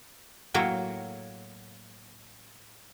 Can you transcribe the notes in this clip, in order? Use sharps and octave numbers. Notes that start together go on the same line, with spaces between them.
A2 F#3 A#3 C#5 G5